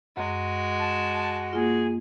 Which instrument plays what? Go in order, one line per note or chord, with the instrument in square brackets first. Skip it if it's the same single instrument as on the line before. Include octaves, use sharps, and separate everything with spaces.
[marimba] F#2 [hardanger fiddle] G#3 [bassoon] F#4
[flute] A5
[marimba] A#3 F4 [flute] G#4